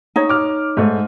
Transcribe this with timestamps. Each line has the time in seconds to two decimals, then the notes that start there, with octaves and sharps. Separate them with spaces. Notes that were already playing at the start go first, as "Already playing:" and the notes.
0.16 D#4 C#5
0.29 D6 F6
0.77 G#2 A3